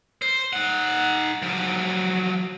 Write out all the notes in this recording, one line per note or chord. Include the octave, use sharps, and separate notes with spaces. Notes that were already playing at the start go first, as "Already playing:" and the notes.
C5
D#4 F#5
F3 F#3